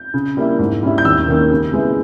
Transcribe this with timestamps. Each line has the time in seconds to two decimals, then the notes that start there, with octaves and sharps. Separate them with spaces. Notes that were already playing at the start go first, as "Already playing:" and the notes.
Already playing: G6
0.14 C#3
0.37 G3 A#3 E4
0.59 G#2
0.83 G3 C#4 E4
0.98 G6
1.05 D#2 E6
1.28 D#3 A#3 C#4
1.51 C#3
1.73 G#3 B3 E4